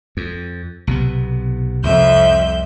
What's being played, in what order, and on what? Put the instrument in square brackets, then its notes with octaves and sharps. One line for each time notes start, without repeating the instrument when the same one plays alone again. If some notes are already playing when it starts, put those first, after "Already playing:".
[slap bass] F2
B1 C3 B3
[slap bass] C2 [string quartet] F2 E5 G6